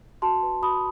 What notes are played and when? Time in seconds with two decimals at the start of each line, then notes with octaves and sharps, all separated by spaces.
0.22 F#4 A5 C6
0.43 B4
0.62 F#4 B5 D#6